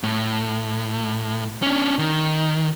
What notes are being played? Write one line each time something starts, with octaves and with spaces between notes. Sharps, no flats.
A2
C#4 D4
D#3